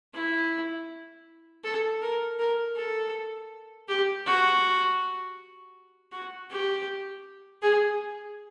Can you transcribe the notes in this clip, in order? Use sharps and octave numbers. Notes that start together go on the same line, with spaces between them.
E4
A4
A#4
A#4
A4
G4
F#4
F#4
G4
G#4